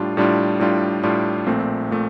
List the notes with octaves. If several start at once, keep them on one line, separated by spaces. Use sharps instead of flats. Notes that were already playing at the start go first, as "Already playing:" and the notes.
Already playing: A2 G3 D4 F4
A2 G3 D4 F4
A2 G3 D4 F4
A2 G3 D4 F4
A#1 A#2 A3 C4
A#2 A3